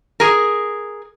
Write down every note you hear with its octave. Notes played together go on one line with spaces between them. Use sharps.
G#4 A#4